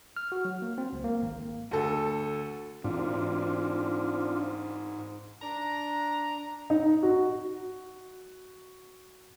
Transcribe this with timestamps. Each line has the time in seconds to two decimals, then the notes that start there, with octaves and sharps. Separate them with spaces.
0.17 F6
0.32 F#4
0.45 F#3
0.62 A#3
0.78 C4
0.92 C#2
1.04 A#3
1.22 G#1
1.71 D2 A4
2.84 G#2 E3 C4 D4 F4
5.42 D4 A#5
6.70 D#4
7.03 F#4